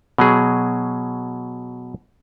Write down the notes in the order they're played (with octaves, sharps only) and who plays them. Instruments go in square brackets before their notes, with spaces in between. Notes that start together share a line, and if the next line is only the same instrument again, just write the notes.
[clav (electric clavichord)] B2 F#3 G#4